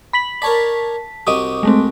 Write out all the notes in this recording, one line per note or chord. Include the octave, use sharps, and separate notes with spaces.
B5 B6 F#7
A#4 C#5 D5 A5 B6
C2 F#4 G4 D#5 D6 D#6
G#3 A3 C4